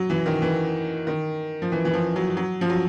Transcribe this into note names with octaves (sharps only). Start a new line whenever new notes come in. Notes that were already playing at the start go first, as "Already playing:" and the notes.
Already playing: F#3
E3
D#3
E3
D#3
F3
E3
E3
F3
F#3
F#3
F3
F#3